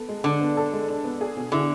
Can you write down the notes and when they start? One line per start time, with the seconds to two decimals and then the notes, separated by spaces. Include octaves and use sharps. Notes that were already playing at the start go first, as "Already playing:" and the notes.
Already playing: B3 A4
0.08 G#3
0.24 D3 D4
0.41 B3
0.57 A4
0.72 G#3
0.88 D4
1.04 B3
1.21 G#4
1.37 B2
1.52 D3 E4